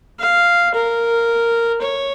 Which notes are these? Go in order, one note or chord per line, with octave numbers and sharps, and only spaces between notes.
F5
A#4
C#5